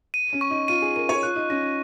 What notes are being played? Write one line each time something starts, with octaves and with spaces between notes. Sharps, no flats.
D#7
C#4
C#6
D#4
F4 D#7
G#4
A#4 D#7
C#5
F4 F#6
D#4
C#4 A#6